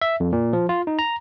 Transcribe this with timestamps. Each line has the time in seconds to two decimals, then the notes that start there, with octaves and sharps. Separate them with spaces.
0.02 E5
0.20 F2
0.32 A#2
0.53 F3
0.69 F4
0.87 D#4
0.99 A#5